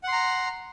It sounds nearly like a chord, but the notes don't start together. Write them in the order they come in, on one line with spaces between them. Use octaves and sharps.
F#5 C6 A#5